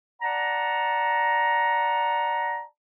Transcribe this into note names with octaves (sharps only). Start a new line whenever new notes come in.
D5 F#5 A5 A#5